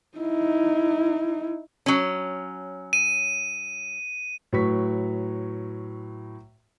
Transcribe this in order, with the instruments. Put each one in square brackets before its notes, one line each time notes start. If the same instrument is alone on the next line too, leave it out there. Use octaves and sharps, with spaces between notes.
[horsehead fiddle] D#4 E4
[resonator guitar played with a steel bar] F#3 C#4
[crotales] D#7
[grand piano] A2 F#3 B4 C#6 B6